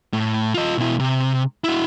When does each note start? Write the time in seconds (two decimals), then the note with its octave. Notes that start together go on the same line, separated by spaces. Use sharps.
0.13 A2
0.54 F4 D#5
0.78 B2 E4
1.00 C3
1.64 E4 F#4